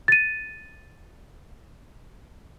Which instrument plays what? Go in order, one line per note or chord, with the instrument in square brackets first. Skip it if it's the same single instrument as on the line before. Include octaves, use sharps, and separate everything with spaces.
[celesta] A6 D#7